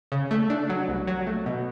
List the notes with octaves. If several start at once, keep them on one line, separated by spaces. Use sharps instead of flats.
C#3
A3
D4
F#3
C2
F#3
A3
B2